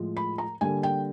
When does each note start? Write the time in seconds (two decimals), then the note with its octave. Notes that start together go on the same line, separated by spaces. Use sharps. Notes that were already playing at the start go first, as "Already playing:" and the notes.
Already playing: A2 F3 G#3
0.17 B5
0.38 A#5
0.61 D3 G3 A#3 G#5
0.83 G5